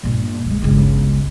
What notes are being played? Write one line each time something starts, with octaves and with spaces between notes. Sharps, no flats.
G1 A#2
E3 G#3
G1 C#2